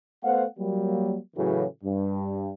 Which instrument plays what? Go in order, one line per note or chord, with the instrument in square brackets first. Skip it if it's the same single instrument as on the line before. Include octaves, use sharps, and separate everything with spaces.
[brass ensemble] A3 B3 C5 F5 F#5
F#3 G3 A#3
A2 C#3 E3 F#3
G2